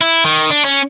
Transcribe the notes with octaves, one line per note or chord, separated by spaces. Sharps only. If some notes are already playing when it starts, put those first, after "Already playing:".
E4
D#3
D4
C#4